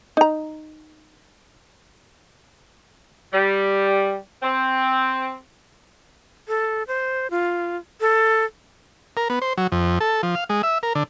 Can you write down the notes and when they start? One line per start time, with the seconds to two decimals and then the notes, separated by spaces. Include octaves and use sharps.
0.17 D#4 A#5
3.33 G3
4.43 C4
6.48 A4
6.87 C5
7.31 F4
8.01 A4
9.17 A#4
9.30 B3
9.42 C5
9.58 F#3
9.72 F2
10.00 A4
10.23 F3
10.35 F5
10.50 G#3
10.63 E5
10.83 A#4
10.95 D3